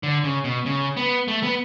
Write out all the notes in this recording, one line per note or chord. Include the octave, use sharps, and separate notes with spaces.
D3
C#3
B2
C#3
B3
A3
B3